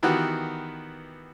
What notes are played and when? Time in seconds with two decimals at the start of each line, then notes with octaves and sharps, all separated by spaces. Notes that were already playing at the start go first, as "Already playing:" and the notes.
0.03 D#3 E3 B3 F#4 G4